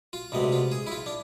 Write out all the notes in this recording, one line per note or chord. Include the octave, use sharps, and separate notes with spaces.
F4
D2 C3 G#3 B3
F4
G#4
E4
F4
D4